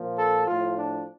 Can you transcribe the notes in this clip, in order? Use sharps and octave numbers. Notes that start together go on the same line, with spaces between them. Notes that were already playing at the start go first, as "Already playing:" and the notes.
Already playing: A#2 F3
A4
A2 F3 F4
D4